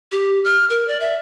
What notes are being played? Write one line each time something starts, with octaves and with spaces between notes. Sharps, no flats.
G4
F6
A#4
D5
E5